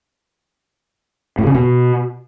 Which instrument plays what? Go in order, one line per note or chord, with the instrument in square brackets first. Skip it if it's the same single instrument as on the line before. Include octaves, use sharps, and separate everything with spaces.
[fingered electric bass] A2
C#3
B2